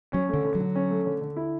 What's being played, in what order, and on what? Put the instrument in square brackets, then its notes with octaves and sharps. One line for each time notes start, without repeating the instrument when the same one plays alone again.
[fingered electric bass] F#3 [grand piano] C#4
[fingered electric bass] D3 [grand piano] A3
[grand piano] D3
[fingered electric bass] F#3
[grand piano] D3
C#4
A3
D3
D3
E4